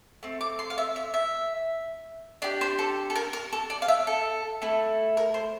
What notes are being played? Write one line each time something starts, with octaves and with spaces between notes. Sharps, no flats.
A3 C4
D6
C6
F5
E5
E5
E5
D4 G4 D5
C5
A4
A4
A#4
A#4
A4
D5
F5
E5
A4
A3 E4 A4
A#4
C5